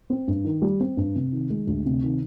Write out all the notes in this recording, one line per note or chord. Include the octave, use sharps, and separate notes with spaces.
C4
G2
D#3
G3
C4
G2
C3
D#3
G#3
D2
C3
D#3